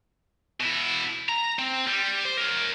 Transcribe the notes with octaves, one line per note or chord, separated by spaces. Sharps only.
B2 E4
A#5
C4
G3
C5
A#4 C#5